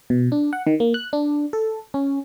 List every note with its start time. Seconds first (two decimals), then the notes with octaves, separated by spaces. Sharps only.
0.10 B2
0.32 D4
0.53 F#5
0.67 D#3
0.80 A#3
0.94 F#6
1.13 D4
1.53 A4
1.94 C#4